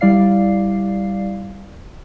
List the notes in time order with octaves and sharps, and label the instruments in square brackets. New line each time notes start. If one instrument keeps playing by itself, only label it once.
[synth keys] G3 E4 D5 F5 C7